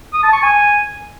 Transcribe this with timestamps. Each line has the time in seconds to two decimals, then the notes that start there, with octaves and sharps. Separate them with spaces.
0.13 D#6
0.23 A5
0.33 C#6
0.42 G#5